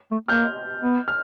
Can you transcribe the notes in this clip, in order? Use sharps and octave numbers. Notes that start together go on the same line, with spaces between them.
A3
A#3 F6 G6
B3
F6